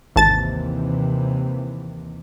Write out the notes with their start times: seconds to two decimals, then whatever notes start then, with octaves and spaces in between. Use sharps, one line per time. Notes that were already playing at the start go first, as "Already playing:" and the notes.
0.16 G#1 D#2 C3 E3 A5 A6